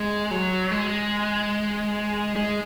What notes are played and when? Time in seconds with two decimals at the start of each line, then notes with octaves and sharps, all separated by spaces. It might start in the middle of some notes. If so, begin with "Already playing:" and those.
Already playing: G#3
0.31 F#3
0.71 G#3
2.36 G#3